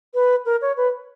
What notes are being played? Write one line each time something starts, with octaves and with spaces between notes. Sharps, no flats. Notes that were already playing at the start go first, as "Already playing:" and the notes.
B4
A#4
C#5
B4